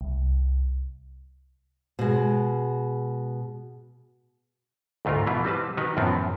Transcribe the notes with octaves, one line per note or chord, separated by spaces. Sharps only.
C2
B2 G#3
D2 G#2 A3 F4 A#4
B2 E3 E4 F4
G3 C4 B4 A5
D#3 F#4 B4 D#5 G#5 A#5
F#2 A2 F3 B3 C4